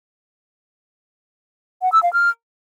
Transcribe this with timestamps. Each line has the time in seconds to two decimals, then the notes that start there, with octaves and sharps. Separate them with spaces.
1.82 F#5
1.92 E6
2.03 F5
2.13 F6